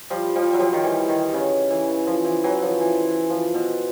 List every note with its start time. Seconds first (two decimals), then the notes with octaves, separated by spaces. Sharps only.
0.10 F3 G3
0.35 F3 G3
0.53 F#3
0.59 F3 G3
0.73 D#3
0.84 E3
1.08 D#3
1.34 C#3
1.70 E3
2.07 F3
2.25 E3
2.44 E3 F#3
2.62 F3
2.81 E3
3.30 F3
3.54 B2